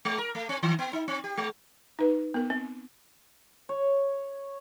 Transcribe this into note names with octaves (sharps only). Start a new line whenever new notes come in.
G#3
A#4
A3
C4
D#3
B3
D#4
C4
G4
G#3
D#4 B4
B3 A#4
C4
C#5